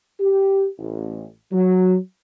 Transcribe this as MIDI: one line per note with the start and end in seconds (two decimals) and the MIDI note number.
0.20 0.66 67
0.78 1.24 33
1.52 1.96 54